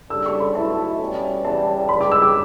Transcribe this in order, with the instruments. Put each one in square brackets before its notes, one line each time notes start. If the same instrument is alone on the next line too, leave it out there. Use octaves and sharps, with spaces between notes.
[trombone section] C#3 G3 D4 A4 [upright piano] E6
[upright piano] C#6
B5
[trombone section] B1 B2 A3 E4 [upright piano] A5
[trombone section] B2 G3 C#4
[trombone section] E2 C#3 G3 [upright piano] A5
[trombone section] C#2 C#3 G3 [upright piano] B5
[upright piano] D6
E6
D6